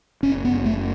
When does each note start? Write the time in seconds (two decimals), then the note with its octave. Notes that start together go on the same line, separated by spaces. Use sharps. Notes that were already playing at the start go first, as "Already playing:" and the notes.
0.23 F#1 C#4
0.45 B3
0.52 F#1
0.65 A3